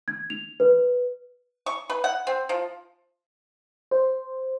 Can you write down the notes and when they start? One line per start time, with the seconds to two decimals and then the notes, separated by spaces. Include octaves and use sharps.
0.08 G#6
0.30 F7
0.60 B4
1.66 C#6
1.90 B4
2.04 F#5
2.27 C4
2.49 F3
3.91 C5